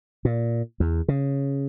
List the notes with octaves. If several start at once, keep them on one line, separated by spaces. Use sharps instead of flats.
A#2
E2
C#3